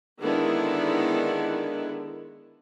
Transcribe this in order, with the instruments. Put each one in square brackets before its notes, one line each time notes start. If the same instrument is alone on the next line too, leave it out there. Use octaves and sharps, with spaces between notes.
[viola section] D3 D#3 G#3 B3 D4 E4